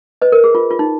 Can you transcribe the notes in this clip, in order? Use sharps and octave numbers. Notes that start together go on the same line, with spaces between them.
B4 D#5
A#4
G#4
F4
F4
D#4